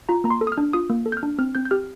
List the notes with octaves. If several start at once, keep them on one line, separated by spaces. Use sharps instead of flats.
F4 A#5
A#3 A#5
C6
A4
D#6
F6
D4
F4 D#6
A#3
A4
G6
F6
D4
C4 F6
C4 G6
G6
G4 F6